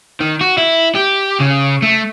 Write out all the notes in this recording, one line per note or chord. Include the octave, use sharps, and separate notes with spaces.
D#3
F#4
E4
G4
C#3
A3